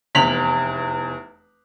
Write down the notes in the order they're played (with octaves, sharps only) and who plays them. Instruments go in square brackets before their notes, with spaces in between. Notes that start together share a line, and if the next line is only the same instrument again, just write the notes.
[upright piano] F1 E2 B6 F7 F#7